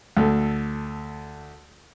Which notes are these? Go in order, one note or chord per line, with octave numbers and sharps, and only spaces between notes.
D2 A4